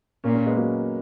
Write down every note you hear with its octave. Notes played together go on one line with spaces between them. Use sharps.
A#2 A#3 C#4
A#3 C#4
G#3 B3
F#3 A#3